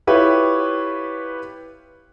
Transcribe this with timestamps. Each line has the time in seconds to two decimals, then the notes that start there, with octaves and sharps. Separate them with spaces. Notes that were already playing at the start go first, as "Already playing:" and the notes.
0.07 E4 F4 G4 B4 C#5